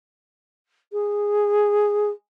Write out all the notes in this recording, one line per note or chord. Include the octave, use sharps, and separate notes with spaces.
G#4